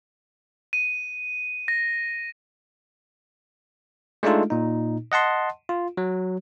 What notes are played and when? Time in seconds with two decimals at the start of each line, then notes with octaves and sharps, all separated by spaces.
0.73 D#7
1.68 A#6
4.23 G#3 A3 D4 D#4 F4 A4
4.50 A#2 D#4
5.12 D#5 F#5 A5 C6
5.69 F4
5.97 F#3